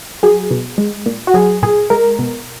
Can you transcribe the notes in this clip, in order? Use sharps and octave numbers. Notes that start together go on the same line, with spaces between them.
F#3 G#4
B2
G#3
A#2
F#4
F#3 G#4
A#2 G#4
G#3 A#4
B2